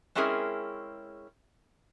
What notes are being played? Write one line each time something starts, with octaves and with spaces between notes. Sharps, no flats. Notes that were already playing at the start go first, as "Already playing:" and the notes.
G#3 C4 C#4 E4 G#4 A#4